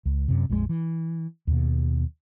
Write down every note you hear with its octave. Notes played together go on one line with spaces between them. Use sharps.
C#2
F#2 C3
A#1 F2 F3 G#3
E3
D#2 B2